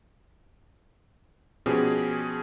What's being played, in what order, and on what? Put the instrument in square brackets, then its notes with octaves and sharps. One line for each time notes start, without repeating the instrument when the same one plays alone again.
[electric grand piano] B2 F3 C#4 G4 G#4